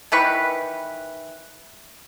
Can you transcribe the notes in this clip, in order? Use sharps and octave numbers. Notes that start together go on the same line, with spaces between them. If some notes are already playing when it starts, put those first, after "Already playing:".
D#3 E3 B4 C#6